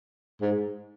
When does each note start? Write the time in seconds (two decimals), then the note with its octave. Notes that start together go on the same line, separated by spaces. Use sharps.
0.42 G#2